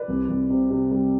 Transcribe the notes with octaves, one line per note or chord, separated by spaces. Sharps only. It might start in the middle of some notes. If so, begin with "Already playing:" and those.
Already playing: B4 D5
C2
C2
C3
C3
G3